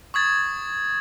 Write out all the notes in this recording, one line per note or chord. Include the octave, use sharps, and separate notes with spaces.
C#6 D#6 G#6 A6